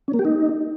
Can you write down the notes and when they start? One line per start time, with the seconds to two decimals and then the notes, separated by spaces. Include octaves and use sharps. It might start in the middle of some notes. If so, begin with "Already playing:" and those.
0.08 C#4
0.14 A#3
0.19 G4
0.25 D#4